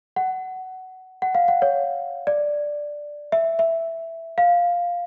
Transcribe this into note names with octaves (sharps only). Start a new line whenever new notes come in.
F#5
F#5
F5
F#5
C#5
D5
E5
E5
F5